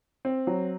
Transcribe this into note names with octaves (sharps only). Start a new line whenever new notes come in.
C4
F#3